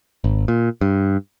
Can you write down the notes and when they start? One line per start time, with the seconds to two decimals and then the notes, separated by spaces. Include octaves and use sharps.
0.24 G#1
0.48 A#2
0.81 G2